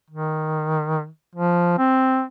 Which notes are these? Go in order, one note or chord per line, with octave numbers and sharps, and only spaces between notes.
D#3
F3
C4